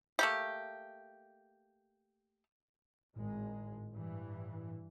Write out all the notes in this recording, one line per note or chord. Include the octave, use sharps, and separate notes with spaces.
A3 A#3 G4
G#1 A2 G#3
G2 E3